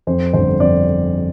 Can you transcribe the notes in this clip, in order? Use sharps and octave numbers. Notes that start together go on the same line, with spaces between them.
F2 C5
G1 C5
F2 D5